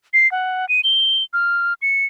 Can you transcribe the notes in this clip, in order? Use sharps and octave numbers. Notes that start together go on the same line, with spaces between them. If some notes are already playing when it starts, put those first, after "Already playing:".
C7
F#5
D#7
G7
F6
C#7